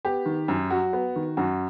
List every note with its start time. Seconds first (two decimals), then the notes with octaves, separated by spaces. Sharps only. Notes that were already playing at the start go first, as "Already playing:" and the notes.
0.05 B3 G4
0.26 D#3
0.48 F#2
0.71 F#3 F#4
0.93 B3
1.16 D#3
1.37 F#2 F#4